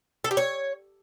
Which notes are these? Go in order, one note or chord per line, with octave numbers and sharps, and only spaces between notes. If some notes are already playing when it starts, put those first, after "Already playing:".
A4
G4
C#5